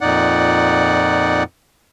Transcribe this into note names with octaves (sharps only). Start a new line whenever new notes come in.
F2 A#2 D#4 D5 F#5